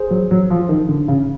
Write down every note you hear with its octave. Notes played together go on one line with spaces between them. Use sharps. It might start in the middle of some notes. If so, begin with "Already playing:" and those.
Already playing: G#4 C5
F#3
F#3
F3
D#3
D3
C#3